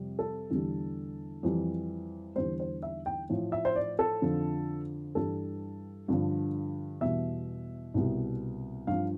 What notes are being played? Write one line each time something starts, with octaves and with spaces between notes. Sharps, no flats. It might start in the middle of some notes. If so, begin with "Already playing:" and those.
Already playing: F2 C3 G3
A4
E2 D3 G3
F2 E3 G3
E2 D3 G3 C5
C5
E5
G5
A2 F3
E5
C5
D5
A4
F2 D3 F3
G2 E3 G3 A4
G2 D3 F3
E2 B2 G3 E5
C2 B2 G3
G2 F3 F5